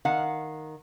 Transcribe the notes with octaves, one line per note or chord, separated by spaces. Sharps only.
D#3 F5 F#5